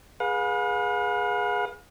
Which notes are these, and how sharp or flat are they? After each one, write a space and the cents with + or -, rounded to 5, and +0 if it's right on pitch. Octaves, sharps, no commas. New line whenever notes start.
G#4 +0 B4 -20 F5 +45